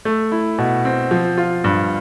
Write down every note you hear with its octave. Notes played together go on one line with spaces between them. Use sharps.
A3
E4
B2
C4
F3
F4
G2